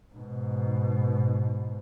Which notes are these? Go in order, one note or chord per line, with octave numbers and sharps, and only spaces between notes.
G#2 B2